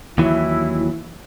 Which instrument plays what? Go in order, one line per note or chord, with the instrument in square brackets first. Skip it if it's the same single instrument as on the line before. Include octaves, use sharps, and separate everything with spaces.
[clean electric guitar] D#2 E3 F#3 [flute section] E4